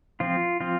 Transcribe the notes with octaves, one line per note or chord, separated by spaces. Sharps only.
F3 C4 F4
F3 C4 F4